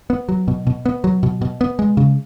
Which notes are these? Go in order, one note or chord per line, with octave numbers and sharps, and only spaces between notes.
B3
F#3
B2
B2
B3
F#3
B2
B2
B3
G#3
C#3